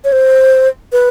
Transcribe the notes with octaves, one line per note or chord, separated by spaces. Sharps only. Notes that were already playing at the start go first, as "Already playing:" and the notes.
C#5
C5
B4